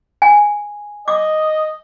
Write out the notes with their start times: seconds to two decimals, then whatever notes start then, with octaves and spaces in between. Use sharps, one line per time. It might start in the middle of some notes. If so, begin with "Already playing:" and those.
0.22 G#5
1.08 D#5 D6